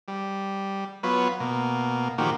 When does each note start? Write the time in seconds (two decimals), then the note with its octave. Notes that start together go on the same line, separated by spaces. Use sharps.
0.08 G3
1.03 F#3 B3 F4 B4 C#5
1.40 B2 A#3
2.18 A#2 D#3 F3 A#3 F#4 G4